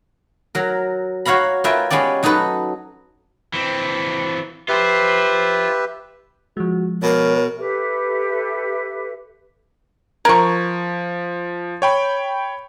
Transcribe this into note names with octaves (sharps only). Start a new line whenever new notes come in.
F#3 A#4
F#4 C#5 F5 A#5 B5
F4 A#4 B4 E5 G5 G#5
G#3 B3 C#4 G4 D5
F#3 D#4 F#4 A4 B4
E3 C4
F4 G4 B4 C5 E5
F3 G#3 F#4
B2 A#4 C#5
G4 A4 B4 E5
F3 A#4 C#6 G#6
C#5 G5 B5